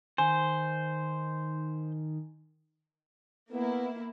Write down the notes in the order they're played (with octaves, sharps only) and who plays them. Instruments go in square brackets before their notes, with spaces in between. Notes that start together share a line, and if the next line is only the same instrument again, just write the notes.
[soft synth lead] D#3 [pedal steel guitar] C5 [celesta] G#5
[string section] A#3 E4 [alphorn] B3